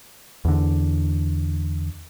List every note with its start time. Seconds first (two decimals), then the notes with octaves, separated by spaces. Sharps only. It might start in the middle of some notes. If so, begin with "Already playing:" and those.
0.45 E2 D3